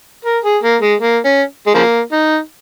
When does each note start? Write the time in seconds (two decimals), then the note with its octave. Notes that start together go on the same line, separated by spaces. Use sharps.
0.25 A#4
0.44 G#4
0.63 A#3
0.81 G#3
1.00 A#3
1.25 C#4
1.67 G#3
1.74 C#3 F3 A#3
2.12 D#4